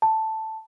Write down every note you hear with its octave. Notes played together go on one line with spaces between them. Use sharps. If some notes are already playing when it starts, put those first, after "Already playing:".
A5